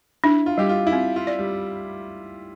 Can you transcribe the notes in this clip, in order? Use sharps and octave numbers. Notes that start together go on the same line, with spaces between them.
D4 E4
F4
G3 G4
F4
E4
C4 F4
F4
D5
G3